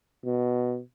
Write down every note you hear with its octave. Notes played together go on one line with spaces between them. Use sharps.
B2